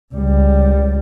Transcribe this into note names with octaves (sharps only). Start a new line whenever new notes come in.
C#2 G3